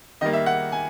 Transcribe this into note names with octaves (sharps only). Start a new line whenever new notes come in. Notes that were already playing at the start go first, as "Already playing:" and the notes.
D#3 G3 A#3 D#5
E5
F#5
G#5